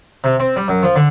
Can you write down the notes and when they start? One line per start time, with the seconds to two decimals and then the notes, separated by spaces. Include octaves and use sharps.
0.24 C3
0.40 C4
0.56 G3
0.68 F#2
0.83 F3
0.96 D3